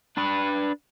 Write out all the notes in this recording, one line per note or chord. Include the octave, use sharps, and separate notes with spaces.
D4 B4